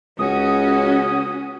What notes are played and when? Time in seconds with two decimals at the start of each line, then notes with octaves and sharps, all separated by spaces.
0.19 C#2 C#4 F#4 D#6